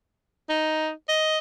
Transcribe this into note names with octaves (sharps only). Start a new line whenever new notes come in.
D#4
D#5